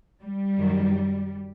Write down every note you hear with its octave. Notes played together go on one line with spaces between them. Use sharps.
G3
F#2 D#3 F#3